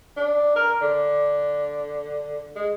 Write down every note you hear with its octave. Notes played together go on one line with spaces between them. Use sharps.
D4
A#4
D3
G#3